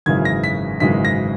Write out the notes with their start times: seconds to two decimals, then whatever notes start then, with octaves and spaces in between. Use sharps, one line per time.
0.06 G#1 F#2 C#3 E3 G#3 G#6
0.25 A#6
0.44 B6
0.80 G#1 F#2 C#3 E3 G#3 B6
1.05 A#6